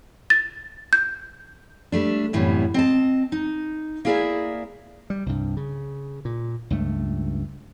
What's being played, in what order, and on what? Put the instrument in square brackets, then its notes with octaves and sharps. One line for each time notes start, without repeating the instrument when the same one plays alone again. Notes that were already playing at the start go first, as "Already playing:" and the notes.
[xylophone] A6
G6
[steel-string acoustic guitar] G3 A3 D4
F#2 A2 C3 E3 G3 B3
C4 D#5 A5
D#4
A#3 E4 G#4 A#4 D5 E5
[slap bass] G3
C2 G2
C#3
A#2
C#2 G2 A3